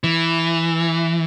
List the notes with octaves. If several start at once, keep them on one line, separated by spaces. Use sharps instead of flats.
E3